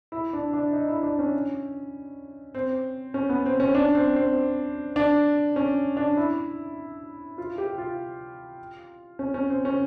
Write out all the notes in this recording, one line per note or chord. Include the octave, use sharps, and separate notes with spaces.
E4
D4
D4
D#4
E4
D4
C#4
C4
C#4
B3
C4
C#4
D4
C4
C4
D4
C#4
D4
E4
F4
G4
F4
C#4
C#4
C4
C#4